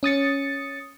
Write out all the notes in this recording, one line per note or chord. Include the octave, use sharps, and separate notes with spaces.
C#4 D#6 A6 C#7